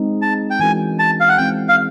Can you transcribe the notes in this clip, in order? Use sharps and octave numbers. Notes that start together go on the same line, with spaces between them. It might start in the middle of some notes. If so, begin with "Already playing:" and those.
Already playing: G#3 C4 D#4 G#4
A5
G5
E3 G#3 C#4 F#4 A#4 G#5
A5
F5
F#5
F3 G#3 C4 E4 G5
F5